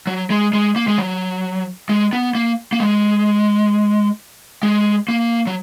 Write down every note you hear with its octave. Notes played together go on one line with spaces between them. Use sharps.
F#3
G#3
G#3
A#3
G#3
F#3
G#3
B3
A#3
A#3
G#3
G#3
A#3
F#3